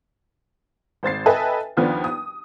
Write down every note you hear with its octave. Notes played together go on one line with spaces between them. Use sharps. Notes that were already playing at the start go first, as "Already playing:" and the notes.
G#1 C5 A6 C7
A4 B4 D#5 E5 G5 G#5
D#2 F3 B3 D4
D#6